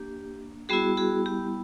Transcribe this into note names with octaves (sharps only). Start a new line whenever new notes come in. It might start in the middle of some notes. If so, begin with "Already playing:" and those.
Already playing: A#3 D4 G4
G3 B3 E4 F#4 G#4
F#4 G#4
G4